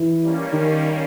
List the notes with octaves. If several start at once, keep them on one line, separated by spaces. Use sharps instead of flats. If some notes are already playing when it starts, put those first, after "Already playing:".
Already playing: E3
G3 A#3 C#4
D#3